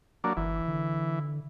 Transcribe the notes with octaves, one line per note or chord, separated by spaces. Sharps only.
F#3 A#3 D4
G1 E3
D3